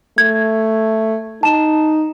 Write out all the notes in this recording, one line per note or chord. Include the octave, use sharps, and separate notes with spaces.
A3 G#6
D#4 A5 E7